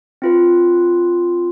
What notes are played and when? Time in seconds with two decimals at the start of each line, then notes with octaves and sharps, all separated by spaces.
0.22 C4 F4 B4